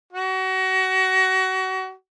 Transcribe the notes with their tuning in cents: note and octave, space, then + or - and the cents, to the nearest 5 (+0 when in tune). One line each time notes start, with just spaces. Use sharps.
F#4 +30